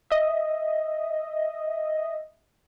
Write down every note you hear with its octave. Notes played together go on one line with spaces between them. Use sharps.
D#5 E5